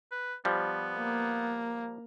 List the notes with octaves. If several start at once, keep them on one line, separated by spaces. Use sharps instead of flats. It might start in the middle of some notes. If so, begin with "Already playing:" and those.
B4
F3 G3 B3
A#3